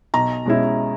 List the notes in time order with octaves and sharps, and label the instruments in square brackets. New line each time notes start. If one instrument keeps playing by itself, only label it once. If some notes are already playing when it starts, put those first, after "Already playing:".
[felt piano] B1 A#5
B2 G#3 C#4 E4